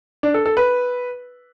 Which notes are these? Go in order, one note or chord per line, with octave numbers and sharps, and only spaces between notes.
D4
A4
A4
B4